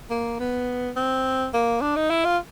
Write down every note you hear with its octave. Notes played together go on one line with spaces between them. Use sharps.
A#3
B3
C4
A#3
D4
D#4
E4
F4